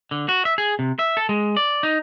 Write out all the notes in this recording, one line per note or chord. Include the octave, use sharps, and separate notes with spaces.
D3
F#4
E5
G#4
C3
E5
A4
G#3
D5
D#4